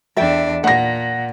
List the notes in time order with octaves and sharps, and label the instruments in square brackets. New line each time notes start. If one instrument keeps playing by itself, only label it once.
[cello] E2 D4 [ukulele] A4 E5 G5
[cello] A#2 [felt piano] F#5 A#6